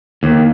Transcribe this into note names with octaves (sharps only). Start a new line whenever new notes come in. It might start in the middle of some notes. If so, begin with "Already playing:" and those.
D#2